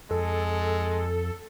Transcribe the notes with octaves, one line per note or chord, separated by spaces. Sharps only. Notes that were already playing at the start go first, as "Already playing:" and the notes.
F2 G#3 A4